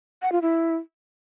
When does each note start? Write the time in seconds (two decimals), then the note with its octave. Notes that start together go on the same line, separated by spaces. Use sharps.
0.22 F#5
0.32 F4
0.42 E4